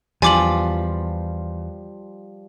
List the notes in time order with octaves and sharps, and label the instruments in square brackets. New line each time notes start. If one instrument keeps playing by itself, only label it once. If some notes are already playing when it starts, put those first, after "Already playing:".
[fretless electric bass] E2 [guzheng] F3 G3 F4 [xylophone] G#5 D6 F#7